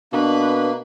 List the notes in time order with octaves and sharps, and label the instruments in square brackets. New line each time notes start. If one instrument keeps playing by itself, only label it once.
[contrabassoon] B2 [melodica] A#3 [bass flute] D4 [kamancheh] B4